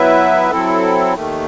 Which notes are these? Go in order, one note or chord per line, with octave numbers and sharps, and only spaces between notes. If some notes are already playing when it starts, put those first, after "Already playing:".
Already playing: F#3 B3 E4 B4 E5
F#3 C4 E4 A4
D#2 D#3 A3